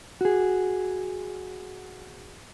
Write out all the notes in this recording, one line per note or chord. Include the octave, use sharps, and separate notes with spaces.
F#4 G#4